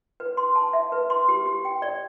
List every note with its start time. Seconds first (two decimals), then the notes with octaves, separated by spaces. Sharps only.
0.20 B4
0.37 C6
0.56 A5
0.73 E5
0.92 B4
1.10 C6
1.29 G4
1.46 G4
1.65 G5
1.82 D5